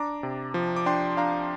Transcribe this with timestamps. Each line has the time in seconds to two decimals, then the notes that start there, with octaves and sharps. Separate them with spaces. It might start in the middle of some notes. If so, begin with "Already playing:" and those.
Already playing: D4 A#5 D6
0.23 C3
0.54 F3
0.76 D6
0.86 D4 G5 C6
1.17 D4 F5 A#5